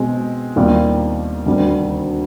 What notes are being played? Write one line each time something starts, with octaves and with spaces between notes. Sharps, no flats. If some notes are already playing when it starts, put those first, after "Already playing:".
Already playing: B2 G#3 C4
D#2 D#3 G3 C4 F4
D2 C3 D#3 G3